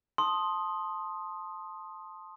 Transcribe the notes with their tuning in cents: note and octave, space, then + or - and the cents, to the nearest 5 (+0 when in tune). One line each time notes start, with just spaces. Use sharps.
A5 +0 C6 +10 D#6 +0